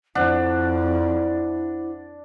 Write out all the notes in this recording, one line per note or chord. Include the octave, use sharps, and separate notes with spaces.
F2 D4 E4 C5 F#5